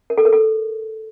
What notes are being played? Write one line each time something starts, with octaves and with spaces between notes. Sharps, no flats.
A#4
A4
A#4
A4